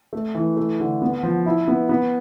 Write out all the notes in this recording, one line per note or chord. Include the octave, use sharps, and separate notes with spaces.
A3
E3
A3
D3
B3
F3
E4
B3
B3